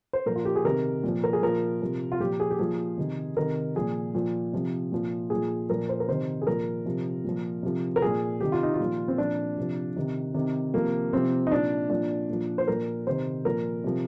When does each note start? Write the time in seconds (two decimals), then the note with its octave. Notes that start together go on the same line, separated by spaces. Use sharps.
0.13 C5
0.26 A#2 F3 A#4
0.36 F4
0.45 G4
0.56 G#4
0.65 C3 D#3 A#4
1.04 A#2 F3
1.24 A#4
1.33 G#4
1.43 A#2 F3 A#4
1.82 C3 F3
2.12 F4
2.20 A#2 F3 G4
2.40 G#4
2.51 G4
2.59 A#2 F3 G#4
2.98 C3 D#3
3.37 C3 D#3 A#4
3.75 A#2 F3 G#4
4.15 A#2 F3
4.53 C3 F3
4.92 A#2 F3
5.30 A#2 F3 G#4
5.69 A#2 F3 A#4
5.89 C5
6.00 A#4
6.08 C3 D#3 C5
6.42 G#4
6.47 A#2 F3 A#4
6.86 C3 F3
7.25 A#2 F3
7.63 C3 F3
7.96 A#4
8.02 F3 G#4
8.07 A#2
8.40 C3 D#3 G4
8.52 F4
8.63 D#4
8.74 F4
8.80 A#2 F3
9.08 C4
9.18 A#2 F3 D4
9.57 C3 F3
9.97 C3 D#3
10.35 C3 D#3
10.74 C3 F3 A#3
11.13 C3 F3 C4
11.47 D#4
11.52 A#2 F3 D4
11.90 A#2 F3 D4
12.30 A#2 F3
12.58 C5
12.68 A#2 F3 A#4
13.07 C3 D#3 C5
13.45 A#2 F3 A#4
13.84 C3 F3